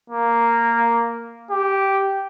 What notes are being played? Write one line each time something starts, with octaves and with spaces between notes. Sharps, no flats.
A#3
G4